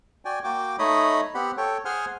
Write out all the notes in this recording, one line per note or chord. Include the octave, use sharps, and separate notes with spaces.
F#4 D5 G5 G#5
A#3 F#4 G5 D6
A3 D#4 C#5 D#5 B5 D#6
B3 C4 G4 F#5 B5
A4 C#5 G5
G#4 C5 F#5 G#5 C6 F6